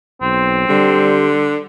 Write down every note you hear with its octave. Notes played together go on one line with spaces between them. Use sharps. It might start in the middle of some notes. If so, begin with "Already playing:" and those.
B1 C4
D3 G3